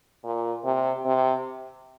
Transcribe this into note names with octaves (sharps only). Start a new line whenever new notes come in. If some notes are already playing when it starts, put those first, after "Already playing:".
A#2
C3
C3